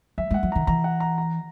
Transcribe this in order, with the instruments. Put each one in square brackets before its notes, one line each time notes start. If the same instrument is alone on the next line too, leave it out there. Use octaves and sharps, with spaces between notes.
[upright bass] F#3 [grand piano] E5
[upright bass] G#3 [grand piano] F#5
[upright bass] F#3
[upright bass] D#3 [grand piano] A#5
[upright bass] E3 [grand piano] A#5
[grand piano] F#5
A#5
A#5